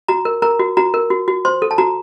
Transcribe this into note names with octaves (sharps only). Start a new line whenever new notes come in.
F#4 A#5
A#4
A#4 A#5
F#4
F#4 A#5
A#4
F#4
F#4
C5 C6
A4
A5
F#4 A#5